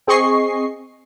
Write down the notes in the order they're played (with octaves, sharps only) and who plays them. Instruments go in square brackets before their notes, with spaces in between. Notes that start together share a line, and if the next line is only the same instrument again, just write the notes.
[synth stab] C4 G#4 D#5 C#6 C7